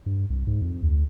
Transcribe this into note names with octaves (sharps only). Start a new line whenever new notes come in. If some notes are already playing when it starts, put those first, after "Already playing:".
G2
C2
G#2
F2
D2